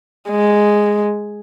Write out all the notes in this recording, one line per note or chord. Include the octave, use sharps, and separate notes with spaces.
G#3